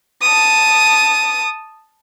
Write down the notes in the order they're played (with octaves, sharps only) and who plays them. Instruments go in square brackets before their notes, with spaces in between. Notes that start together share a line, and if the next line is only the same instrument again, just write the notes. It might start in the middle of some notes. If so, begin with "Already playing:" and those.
[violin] A5 D#6